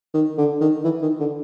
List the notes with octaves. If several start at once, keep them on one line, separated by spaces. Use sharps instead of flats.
D#3
D3
D#3
E3
D#3
D3